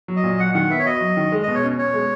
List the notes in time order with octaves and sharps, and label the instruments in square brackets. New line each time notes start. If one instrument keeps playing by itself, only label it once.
[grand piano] F#3
[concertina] D#5
[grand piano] A#2
[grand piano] F#3 [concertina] F#5
[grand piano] D#3 [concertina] F#5
[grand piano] B3 [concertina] E5
[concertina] C#5
[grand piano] F#4 [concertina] D#5
[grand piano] F#3
D#3
G#3
[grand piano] B2 [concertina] D#5
[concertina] C#5
[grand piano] C#4
[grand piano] B2 [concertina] C#5
[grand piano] G#3